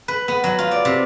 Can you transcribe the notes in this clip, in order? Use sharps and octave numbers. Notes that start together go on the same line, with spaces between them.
B4
B3
F#3
F4
D5
C3